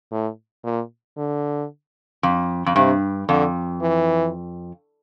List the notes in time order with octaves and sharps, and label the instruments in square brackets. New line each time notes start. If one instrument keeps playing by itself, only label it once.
[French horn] A2
A#2
D3
[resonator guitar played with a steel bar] F2
F2
[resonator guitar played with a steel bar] G2 [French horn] C3
[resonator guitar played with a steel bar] F2 [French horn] D3
[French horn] E3